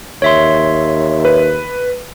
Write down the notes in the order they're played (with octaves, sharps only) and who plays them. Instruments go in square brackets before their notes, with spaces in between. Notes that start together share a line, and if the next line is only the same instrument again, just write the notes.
[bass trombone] D#2 [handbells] C#5 E5 C6
[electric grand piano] B4